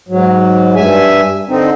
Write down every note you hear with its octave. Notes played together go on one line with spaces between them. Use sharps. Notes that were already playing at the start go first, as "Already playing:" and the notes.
G#2 F#3
G2 E5 G#5
D3 C4 D#4